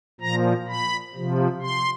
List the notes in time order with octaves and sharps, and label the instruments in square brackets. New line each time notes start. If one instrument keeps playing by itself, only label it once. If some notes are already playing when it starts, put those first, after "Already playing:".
[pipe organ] A#2 F3 A#5
B5
C3 F3
C6